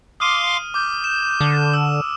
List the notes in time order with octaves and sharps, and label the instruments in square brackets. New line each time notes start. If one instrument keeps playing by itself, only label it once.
[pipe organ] F5 C6 D6 [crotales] D#6 F6 D#7
[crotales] D6 [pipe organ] G6
[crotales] E7
[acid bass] D3
[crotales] E6